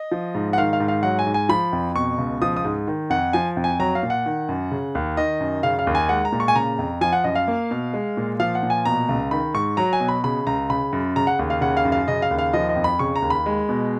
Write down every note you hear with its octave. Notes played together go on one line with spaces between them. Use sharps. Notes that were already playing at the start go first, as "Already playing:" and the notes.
Already playing: D#5
F3
G#2
F#5
D#3 F5
F5
G#2
F5
F#3 F#5
G#5
G#2
G#5
F3 B5
F2
B2 C#6
C#2
F3 D#6
D#6
G#2
D#3
F2 F#5
F3 G#5
F2
G#5
F#3 A#5
F5
A#2
F#5
D#3
F#2
C#3
D#2
D#3 D#5
F#2
C#3 F5
F5
D#2
G#5
G#3 F#5
A#5
A#2
C#6
G#5
C#3 A#5
F2
F3 G#5
F#5
F#2 D#5
F5
A#3
B2
G#3
A#2
F3 F5
F#5
A#2
G#5
B2 A#5
C#2
D#3 B5
G#2 C#6
F#3 A#5
G#5
B2
B5
C#3 B5
C#2 A#5
C#3 B5
F#2
C#3 A#5
F#5
D#2
F5
C#3 F#5
F5
F#2
F5
C#3 D#5
F5
D#2
F5
F3 D#5
D#5
F2
B5
C#3 C#6
A#5
D#2
B5
G#3
B2